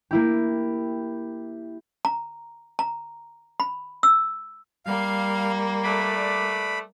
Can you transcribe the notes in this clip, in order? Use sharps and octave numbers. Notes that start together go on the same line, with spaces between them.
A#3 E4 G4
A#5
A#5
B5
E6
G3 A#3 F5
A3 B4 D5 B5